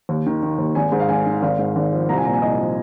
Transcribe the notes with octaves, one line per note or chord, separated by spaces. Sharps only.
D#2
D#3
D#3
D#2
G#1 G#5
G#2
F5
G#1 G#5
D#3
G#1 F5
G#2
G#1
F3
C2 A#5
G#5
A#2 A#5
G#5
C2 D#5
F3